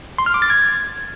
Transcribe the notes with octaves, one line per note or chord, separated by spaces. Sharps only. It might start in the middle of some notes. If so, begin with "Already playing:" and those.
C6
F6
D6
A6
G#6